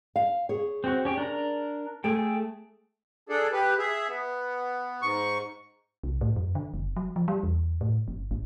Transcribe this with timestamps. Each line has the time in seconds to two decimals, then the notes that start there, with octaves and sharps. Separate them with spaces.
0.16 F5
0.49 G#4 C#5
0.84 C4 F#4
1.05 C#4 G4
1.17 D4 A#4 A#5
2.04 A3 G#4 A4 G5
3.29 D4 G#4 A4 D5
3.52 G4 B4
3.78 G#4 E5
4.08 B3
5.02 G#2 C#6
6.04 C2
6.21 A2
6.36 F#2
6.55 D3
6.74 F#1
6.97 F#3
7.16 F3
7.28 G3
7.43 E2
7.81 A2
8.08 G1
8.31 G#1